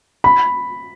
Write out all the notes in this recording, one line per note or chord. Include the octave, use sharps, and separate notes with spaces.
B5